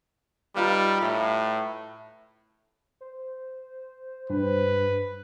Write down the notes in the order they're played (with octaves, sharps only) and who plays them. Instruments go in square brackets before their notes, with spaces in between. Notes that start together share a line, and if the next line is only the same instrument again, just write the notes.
[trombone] G3 [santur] D#4 F4 B4
[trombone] A2 [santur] E5
[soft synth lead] C5
[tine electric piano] G2 [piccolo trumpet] B4